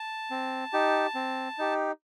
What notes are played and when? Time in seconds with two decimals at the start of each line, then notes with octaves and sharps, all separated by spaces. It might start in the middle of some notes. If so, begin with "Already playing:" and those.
Already playing: A5
0.31 C4
0.73 D#4 G4
1.15 C4
1.58 D#4 G4